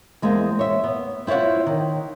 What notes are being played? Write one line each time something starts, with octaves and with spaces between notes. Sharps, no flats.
E2 G#3 A#3 C4
C#5 E5
B3
C4 E4 F4 C#5 F#5
D#3